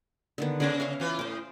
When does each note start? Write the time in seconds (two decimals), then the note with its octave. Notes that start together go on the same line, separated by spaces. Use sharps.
0.38 D3 D#3 B3
0.60 C#3 C#4 D4 G#4
0.80 C#5 E5 F5
1.00 E3 F4
1.19 A2 C5 D6